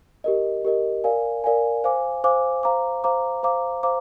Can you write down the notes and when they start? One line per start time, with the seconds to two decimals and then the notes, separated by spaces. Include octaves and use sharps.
0.24 G4 A#4 D#5
0.65 G4 A#4 D#5
1.04 A#4 D5 F5 G#5
1.44 A#4 D5 F5 G#5
1.84 C5 F5 G#5 D6
2.24 C5 F5 G#5 D6
2.63 C5 F5 A#5 D6
3.04 C5 F5 A#5 D6
3.43 C5 F5 A#5 D6
3.83 C5 F5 A#5 D6